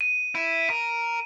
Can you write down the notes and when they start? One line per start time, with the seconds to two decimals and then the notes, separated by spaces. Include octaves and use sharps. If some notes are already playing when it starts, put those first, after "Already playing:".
0.01 D#7
0.35 E4
0.70 A#4